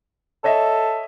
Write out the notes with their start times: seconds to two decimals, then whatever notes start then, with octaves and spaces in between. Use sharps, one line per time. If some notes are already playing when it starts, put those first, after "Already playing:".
0.44 A4 C#5 D#5 E5